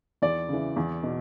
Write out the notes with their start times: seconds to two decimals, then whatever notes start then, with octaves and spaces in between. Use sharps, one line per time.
0.22 E2 D5
0.49 C#3 E3
0.76 E2
1.03 B2